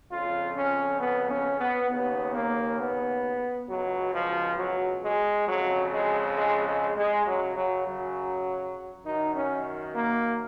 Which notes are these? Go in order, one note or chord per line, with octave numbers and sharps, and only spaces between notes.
F2 C#3 F4
C#4
B3
C#4
B3
D#2 C#3 B3
A#3
B3
C#2 B2 F#3
F3
F#3
G#3
F2 C#3 F#3
G#3
G#3
G#3
G#3
F#2 C#3 F#3
F#3
F#3
F#2 D#3 D#4
C#4
A#3